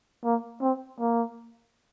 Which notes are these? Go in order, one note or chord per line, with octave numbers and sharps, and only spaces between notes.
A#3
C4
A#3